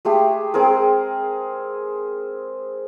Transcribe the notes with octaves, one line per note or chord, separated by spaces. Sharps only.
G#3 A3 G4 G#4
G#3 C4 G#4 A#4